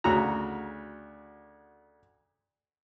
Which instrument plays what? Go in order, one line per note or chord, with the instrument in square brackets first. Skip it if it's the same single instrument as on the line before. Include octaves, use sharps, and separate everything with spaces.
[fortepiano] D2 C#3 F#4 A#5